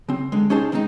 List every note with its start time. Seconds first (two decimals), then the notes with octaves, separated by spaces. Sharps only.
0.09 C#3 C4
0.32 D3 G#3
0.50 C2 C#4 D#4 G#4 C5 A5
0.72 D#3 G#3 C4 C#4 D#4